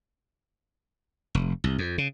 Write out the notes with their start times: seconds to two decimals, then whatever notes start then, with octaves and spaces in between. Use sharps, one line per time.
1.35 F1
1.64 C2
1.78 F2
1.98 C#3